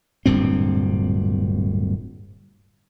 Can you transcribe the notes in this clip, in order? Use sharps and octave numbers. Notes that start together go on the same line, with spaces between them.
D1 G2 A#2 C4